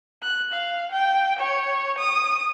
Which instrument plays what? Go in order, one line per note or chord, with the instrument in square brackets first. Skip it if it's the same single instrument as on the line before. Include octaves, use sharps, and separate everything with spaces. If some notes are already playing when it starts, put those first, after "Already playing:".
[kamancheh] F#6
F5
G5
C#5
D#6